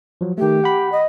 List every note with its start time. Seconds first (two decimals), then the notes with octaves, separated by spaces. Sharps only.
0.21 F3 F#3
0.38 D#3 A3 G4
0.64 F#5 B5
0.91 D#5